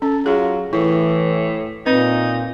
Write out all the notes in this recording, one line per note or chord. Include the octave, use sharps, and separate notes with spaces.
C#4 A4
F#3 F4 G#4
A2 E3 E4
A#2 C4 D#4 B4